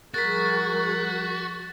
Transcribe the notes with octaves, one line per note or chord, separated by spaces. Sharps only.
F3 G3 F#4 G#4 A#4 A6 B6